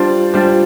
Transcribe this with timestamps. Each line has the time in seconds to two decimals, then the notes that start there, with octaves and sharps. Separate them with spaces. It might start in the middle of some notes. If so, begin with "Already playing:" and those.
Already playing: G3 D4 F4 C5
0.34 G3 D4 F4 C5